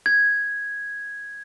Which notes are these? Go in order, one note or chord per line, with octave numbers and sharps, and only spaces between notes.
G#6